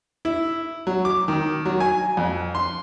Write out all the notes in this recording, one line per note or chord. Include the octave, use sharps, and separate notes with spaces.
E4
F#3
D6
D#3
F#3
G#5
F2
C6